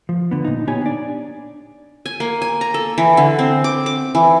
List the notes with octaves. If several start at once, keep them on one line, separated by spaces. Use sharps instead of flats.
F3
D3 B3
A#2 D#4
B3 D#4 G4 C#5 G#5
D4 D5
G#5
A#3
G#5
A#5
A4
E3
D3
C4
D6
D6
E3